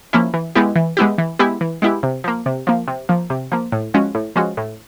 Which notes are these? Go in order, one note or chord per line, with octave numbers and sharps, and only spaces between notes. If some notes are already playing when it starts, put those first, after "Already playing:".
F3 A#3 C#4 E4
E3
G#3 B3 E4 G4
E3
G#3 B3 E4 G4
E3
G#3 B3 E4 G4
E3
G#3 B3 E4 G4
C3
F3 A#3
C3
F3 A#3
C3
F3 A#3
C3
F3 A#3
A2
F3 G#3 C#4 F#4
A2
F3 G#3 C#4 F#4
A2